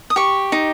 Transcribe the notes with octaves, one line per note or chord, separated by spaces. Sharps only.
D#6
G4 C#6
D#4